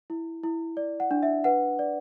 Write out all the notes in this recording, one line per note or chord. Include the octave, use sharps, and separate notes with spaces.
E4
E4
D5
F#5
D4
E5
B4 F#5
D5